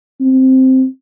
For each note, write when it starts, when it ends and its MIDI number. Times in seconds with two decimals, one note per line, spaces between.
0.20 0.85 60